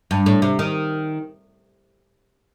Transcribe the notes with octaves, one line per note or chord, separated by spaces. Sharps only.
G2
A2
C3
D#3